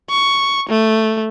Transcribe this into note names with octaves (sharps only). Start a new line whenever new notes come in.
C#6
A3